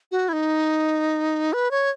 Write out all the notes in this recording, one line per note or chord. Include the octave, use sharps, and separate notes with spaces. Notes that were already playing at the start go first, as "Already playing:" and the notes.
F#4
E4
D#4
B4
C#5